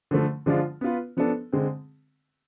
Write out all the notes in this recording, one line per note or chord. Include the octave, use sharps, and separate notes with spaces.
D3 F3 A3
D3 F3 G#3 D4 F4
B3 F4 B4
F3 B3 D4 A4
D3 G#3 C4